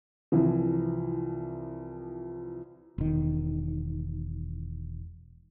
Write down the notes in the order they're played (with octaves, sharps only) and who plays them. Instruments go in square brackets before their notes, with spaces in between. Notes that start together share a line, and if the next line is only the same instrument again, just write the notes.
[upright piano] C2 E3 F3
[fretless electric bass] E1 D#3